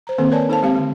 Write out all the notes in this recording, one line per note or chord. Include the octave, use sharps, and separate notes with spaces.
C5 A#5
D#3 A#3 C4 A4 C5
A#4 B4 C#5 D5 G#5 A5
D#4 A4 C5 F5 A5
G#3 C4 G4 F5
D3 G#3